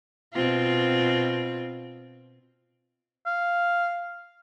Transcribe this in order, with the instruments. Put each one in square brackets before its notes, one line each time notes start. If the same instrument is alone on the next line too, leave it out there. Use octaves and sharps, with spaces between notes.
[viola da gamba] B2 C4 F4
[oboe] F5